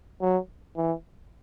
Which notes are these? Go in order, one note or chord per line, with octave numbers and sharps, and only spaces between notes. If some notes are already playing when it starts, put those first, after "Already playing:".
F#3
E3